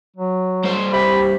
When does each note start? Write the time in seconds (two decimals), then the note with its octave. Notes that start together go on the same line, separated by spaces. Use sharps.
0.16 F#3
0.64 G2 C5
0.93 C3 G4 B5